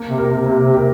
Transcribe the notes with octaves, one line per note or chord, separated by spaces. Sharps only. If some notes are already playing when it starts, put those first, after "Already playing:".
Already playing: A#3
C3
G4 A#4
C3
C3 A#3
C3
G4 A#4